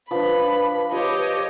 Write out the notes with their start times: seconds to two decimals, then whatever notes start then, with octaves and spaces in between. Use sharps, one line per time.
0.11 F3 D4 B4 B5
0.92 F4 G4 C#5 D#5